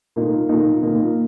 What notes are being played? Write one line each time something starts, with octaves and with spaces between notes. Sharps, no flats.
A#2 A#3 D#4
A#2 A#3 D#4
A#2 A#3 D#4